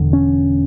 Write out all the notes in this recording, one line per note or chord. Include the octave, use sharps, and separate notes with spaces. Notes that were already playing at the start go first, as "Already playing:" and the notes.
Already playing: E1 E2 D3
C#4